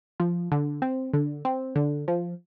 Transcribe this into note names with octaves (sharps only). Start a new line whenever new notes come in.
F3
D3
C4
D3
C4
D3
F3